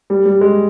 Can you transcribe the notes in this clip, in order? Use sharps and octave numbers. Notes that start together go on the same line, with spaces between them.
G3
G3
G#3